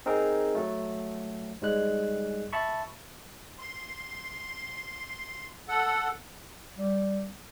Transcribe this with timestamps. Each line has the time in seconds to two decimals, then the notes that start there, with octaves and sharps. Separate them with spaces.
0.06 C4 D#4 G#4 A#4
0.55 F#3 A3
1.62 G#2 G3 G#3 F#6
2.53 E5 A5 B5 C#6
3.59 C6
5.68 A4 F#5
6.78 G3